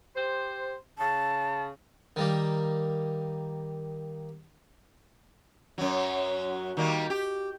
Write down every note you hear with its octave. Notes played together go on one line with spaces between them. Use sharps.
G4 C5
C#3 A5
D#3 G3 A#3
F#2 F#3
D#3 G3 A#3
G4